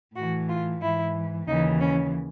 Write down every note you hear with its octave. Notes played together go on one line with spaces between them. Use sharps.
A2 E3 F#4
F4
G#2 E3 E4
D#2 C#3 E3 D#4
C#4